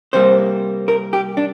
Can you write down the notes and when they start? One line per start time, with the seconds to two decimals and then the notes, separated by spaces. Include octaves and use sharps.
0.13 C3 G3 A#3 C5
0.88 A#4
1.13 G4
1.37 D4